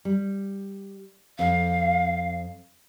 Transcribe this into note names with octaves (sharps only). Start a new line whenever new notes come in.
G3
F2 F5